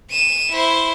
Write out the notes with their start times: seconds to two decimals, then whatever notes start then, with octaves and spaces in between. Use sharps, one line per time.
0.11 D#7 E7
0.52 E4 C5